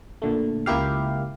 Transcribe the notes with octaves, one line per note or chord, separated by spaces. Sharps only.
A#2 D3 A3
C#2 A#3 E4 G4 F5